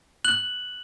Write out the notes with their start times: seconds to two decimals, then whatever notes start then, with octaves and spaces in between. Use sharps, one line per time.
0.25 F#6 F#7